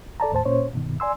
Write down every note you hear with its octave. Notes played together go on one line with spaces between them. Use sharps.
A4 D5 A5 A#5
D#2 A2 C5 A5
A#2 C#4 C5 C#5
G2 B2 D#3
D5 G#5 C6 E6